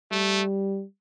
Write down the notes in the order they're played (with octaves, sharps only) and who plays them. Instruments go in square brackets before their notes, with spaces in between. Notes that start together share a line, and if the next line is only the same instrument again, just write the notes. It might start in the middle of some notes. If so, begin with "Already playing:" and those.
[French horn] G3 [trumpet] A3